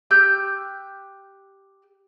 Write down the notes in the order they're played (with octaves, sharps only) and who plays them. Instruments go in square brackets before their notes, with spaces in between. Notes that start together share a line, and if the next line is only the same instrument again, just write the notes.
[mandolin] G4 E6 F#6 G6